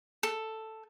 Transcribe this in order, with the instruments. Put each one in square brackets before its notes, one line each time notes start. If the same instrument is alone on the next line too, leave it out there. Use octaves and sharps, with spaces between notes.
[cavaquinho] A4